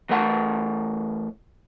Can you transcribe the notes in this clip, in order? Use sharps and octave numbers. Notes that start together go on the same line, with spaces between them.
E3 A3 A#4 F#5 A5